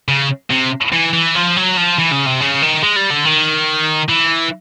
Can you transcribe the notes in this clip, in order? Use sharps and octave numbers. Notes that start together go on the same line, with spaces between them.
C#3
C3
E3
E3
F3
F#3
F3
E3
C#3
C3
C#3
D#3
G#3
G3
D3
D#3
E3